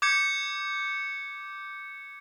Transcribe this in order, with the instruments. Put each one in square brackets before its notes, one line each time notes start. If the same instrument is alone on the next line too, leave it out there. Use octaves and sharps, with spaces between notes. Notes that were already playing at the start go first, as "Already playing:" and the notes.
[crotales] D6 G6 G#6 C#7